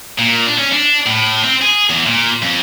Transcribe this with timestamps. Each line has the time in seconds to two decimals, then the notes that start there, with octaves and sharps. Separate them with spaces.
0.19 A#2
0.47 D4
0.59 C#4
0.73 D4
1.06 A2
1.44 C4
1.62 G#4
1.90 E2
2.07 A#2
2.42 F2